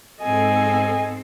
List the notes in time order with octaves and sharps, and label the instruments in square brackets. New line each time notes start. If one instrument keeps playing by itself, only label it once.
[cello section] G#2 C4 A4 [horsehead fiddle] D#5 G#5